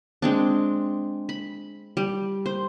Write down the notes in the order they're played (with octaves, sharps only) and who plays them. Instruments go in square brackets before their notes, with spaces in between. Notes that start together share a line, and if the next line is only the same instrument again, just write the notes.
[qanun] G#3 C4 D4
B5
G3
C5